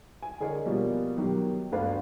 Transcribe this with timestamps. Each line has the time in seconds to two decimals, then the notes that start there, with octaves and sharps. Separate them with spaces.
0.22 G#5
0.40 D3 G#4 A#4 C#5 D#5
0.65 B2 F3 G3 A#3
1.16 B2 D#3 F#3 G4
1.72 G1 D2 D4 B4 F5